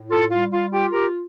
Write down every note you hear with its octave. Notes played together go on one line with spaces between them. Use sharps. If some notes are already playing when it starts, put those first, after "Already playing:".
Already playing: A2
F4 A4
G3 F4
F4
F4 G4
G4 A#4